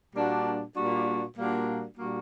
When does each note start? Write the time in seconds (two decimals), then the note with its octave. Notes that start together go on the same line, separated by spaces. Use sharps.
0.14 A#2 G3 A#3 D4 F#4
0.75 A#2 G3 A#3 D4 F#4
1.36 A#2 G3 A#3 D4 F#4
1.98 A#2 G3 A#3 D4 F#4